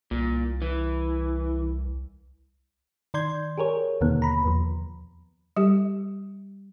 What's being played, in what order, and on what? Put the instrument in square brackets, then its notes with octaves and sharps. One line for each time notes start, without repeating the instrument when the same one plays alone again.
[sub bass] C2 [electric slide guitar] A#2
[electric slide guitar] E3
[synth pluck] D#3 D5 C6 G6 G#6
G4 G#4 A#4 C#5
D#2 B2 D3 D#3 A#3 B3
A#5 B5
E2 F3
[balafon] G3 G4